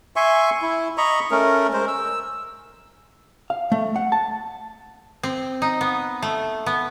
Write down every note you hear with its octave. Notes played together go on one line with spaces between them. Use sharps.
E5 G#5 C6 C#6
E4
D#5 A#5 B5 C#6
A3 C#4 A#4
G#3 A#4 C5
E6
F5
A3
F#5
A5
C4
D#4
B3
A3
B3